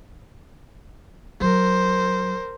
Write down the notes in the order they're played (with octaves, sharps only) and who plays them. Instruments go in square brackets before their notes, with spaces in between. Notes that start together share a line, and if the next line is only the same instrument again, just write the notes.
[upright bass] F#3 [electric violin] A#4 C5